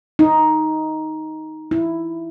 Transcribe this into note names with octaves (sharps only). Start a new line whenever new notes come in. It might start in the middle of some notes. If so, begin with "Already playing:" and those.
D#4
E4